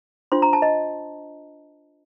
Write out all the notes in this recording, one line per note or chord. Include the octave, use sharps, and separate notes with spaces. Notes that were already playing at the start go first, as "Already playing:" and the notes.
D4 F4 C5 C6
A#5
A5
D#5